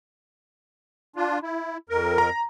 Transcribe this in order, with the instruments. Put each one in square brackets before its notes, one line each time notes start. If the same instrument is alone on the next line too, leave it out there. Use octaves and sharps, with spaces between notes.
[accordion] D4 F4
E4
F2 A#4
[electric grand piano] A#5